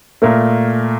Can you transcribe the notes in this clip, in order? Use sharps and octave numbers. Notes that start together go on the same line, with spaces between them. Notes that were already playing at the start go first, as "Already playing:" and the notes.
A#2 A3 A#4